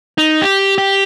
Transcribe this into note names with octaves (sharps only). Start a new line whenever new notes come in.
D#4
G4
G4